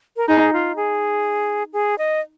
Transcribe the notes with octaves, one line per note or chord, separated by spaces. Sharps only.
A#4
D#4 G#4
F4
G#4
G#4
D#5